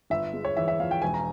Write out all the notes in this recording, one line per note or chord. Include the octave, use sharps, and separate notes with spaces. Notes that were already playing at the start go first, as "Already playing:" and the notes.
G1 E5
G#3
C#5
E3 E5
E5
F2 F5
G5
E1 G#5
A#5